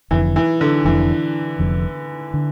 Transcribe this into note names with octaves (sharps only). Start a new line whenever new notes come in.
F1 F2 D3 E3
E3
D3
F1 F2 D3 E3
F1 F2 D3
D3